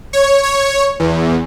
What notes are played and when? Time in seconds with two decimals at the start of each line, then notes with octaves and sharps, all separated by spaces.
0.13 C#5
0.43 C#5
1.00 E2